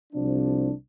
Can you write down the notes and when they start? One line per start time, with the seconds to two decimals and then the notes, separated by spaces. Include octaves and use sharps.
0.13 C2 C3 F3 D4